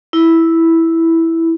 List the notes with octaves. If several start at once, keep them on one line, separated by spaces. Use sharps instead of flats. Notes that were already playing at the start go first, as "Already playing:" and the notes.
E4